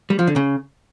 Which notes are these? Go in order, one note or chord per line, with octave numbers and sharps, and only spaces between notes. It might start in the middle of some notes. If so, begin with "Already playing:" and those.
G3
F3
D3
C#3